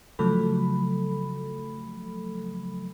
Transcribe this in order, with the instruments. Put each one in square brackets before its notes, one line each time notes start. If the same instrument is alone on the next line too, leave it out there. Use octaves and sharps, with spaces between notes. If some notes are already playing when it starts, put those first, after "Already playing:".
[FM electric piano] C#3 F3 F#3 A3 A4 B5